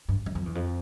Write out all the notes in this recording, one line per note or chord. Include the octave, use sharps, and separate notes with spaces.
G2
F#2
F2
E2
F2